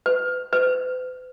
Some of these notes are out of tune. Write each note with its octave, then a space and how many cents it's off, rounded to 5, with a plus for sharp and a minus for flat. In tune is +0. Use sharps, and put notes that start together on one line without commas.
B4 +30
B4 +45